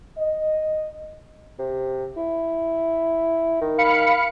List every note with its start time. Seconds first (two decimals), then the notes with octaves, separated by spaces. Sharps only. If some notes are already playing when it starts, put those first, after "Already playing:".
0.18 D#5
1.59 C3
2.17 E4
3.61 D#3
3.78 F5 B5 C#7